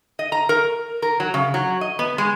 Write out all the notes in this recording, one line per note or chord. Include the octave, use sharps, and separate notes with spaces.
D#5
A#5
A#4
A#4
F#3
C#3
F#3
D#5
B3
G#3